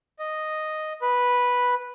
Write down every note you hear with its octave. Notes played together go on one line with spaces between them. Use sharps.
D#5
B4